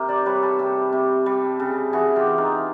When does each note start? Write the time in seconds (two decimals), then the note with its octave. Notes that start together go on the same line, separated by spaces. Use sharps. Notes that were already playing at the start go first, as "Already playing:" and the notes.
Already playing: C3 A#4
0.09 C5 D5
0.26 G3 B4 C#5
0.43 A4 B4
0.59 C3 G4 A4
0.93 C3
1.26 G3
1.60 C#3
1.93 E3 F#4 G#4
2.16 F4 G4
2.27 E3
2.38 D#4 F4